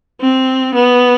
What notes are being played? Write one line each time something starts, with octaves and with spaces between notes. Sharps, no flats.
C4
B3